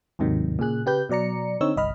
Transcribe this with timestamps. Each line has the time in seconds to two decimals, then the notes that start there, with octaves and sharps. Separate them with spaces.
0.19 D#2 G#2 C3 D#3 F#3
0.59 A#2 C#3 G#4 F#6
0.86 C#3 G4 B4 G6
1.09 B2 F#3 D5 A#5 C#7
1.61 D3 C4 D#4 C#5 E6
1.76 G1 C2 D#5 B5 F6